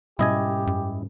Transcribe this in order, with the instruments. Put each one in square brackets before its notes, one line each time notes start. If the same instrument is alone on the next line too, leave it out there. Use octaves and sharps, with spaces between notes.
[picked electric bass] G#2 G3 C#4 [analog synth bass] B2 [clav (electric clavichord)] E4 D#5 G#5 [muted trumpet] G4
[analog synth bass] F#2